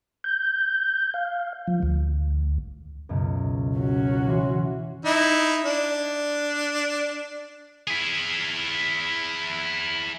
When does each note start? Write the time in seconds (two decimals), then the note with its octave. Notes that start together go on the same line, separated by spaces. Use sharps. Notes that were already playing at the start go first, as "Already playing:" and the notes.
0.24 G6
1.14 F5
1.68 F3
1.83 D2
3.09 C#2 F#2 B2
3.78 C#4 F#4
4.27 E3 C6
5.05 D#4 E4
5.65 D4
7.88 E4 G#4